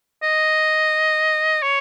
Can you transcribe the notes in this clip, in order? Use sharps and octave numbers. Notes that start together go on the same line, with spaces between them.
D#5
C#5